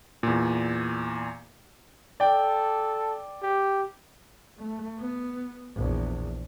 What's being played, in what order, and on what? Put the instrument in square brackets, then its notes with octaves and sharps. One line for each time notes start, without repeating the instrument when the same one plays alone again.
[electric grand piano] E2 A#2
[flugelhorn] A4 [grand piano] D5 G5
[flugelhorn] G4
[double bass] A3
B3
A#1 E2